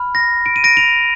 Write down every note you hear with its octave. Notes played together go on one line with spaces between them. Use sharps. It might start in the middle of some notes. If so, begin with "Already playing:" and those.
Already playing: B5 F6
A#6
D7
D#7
A#6 D7
D7 F7